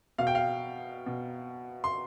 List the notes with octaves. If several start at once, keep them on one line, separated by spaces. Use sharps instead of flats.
B2 F5
G5
F5
B2
C6